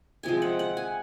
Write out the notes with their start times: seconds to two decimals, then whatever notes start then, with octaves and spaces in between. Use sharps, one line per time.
0.23 C3 F3 G#3 G#5
0.42 F#5
0.59 F#5
0.77 G#5